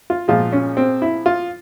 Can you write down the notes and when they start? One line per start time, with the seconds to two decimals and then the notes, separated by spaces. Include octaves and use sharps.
0.10 F4
0.28 A#2 F3 G#3 F4
0.52 C#4
0.77 C4
1.02 E4
1.26 F4